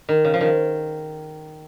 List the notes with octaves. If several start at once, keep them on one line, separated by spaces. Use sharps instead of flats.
D#3
C#3
F3
D#3